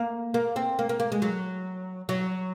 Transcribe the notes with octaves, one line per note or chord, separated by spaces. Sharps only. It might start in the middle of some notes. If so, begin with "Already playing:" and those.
Already playing: A#3
A#3
C4
A#3
A#3
A#3
G#3
F#3
F#3